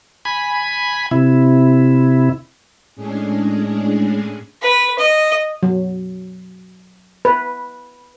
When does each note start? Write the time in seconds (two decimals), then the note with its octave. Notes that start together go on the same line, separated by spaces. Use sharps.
0.25 G#5 B5
1.11 C3 E4
2.96 A2 G#3 C#4 D4 G#4
4.62 B4
4.98 D#5
5.63 F#3
7.25 B4